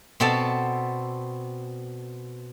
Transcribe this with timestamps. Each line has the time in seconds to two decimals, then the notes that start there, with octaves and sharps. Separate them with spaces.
0.20 B2 B3 C4 A4 D5 A5